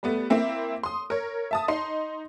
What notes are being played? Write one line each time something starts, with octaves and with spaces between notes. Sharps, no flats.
G3 A3 B3
A#3 C4 E4
C6 D#6
A#4 C#5
E5 A5 D#6
D#4 C6 C7